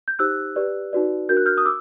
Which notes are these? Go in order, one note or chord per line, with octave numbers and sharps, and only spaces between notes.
G6
D#4 G4 C5 E6 F#6
G4 B4 D5
D#4 F#4 B4 D5
D4 F#4 A#4 G6
F#6
F6 G6
D#6
D6 E6